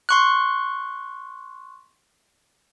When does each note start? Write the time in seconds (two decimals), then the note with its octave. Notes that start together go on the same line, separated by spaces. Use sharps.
0.09 C6 C#6 F#6